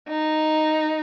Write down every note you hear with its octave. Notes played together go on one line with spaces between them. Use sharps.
D#4